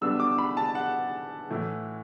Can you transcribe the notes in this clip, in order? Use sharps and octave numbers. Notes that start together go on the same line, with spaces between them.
D3 G3 B3 D4 E6
D6
B5
A5
F#5
A2 E3 A3 E4